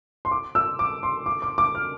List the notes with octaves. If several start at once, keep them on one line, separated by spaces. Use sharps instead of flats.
C6
D6
E6
D6
C6
D6
D6
D6
F6